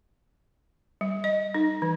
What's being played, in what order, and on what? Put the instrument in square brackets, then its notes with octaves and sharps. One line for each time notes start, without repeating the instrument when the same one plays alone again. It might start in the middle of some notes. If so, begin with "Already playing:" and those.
[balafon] G3
D#5
D#4
E3